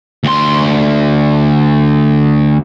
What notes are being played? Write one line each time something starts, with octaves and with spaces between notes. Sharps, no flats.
D2 C6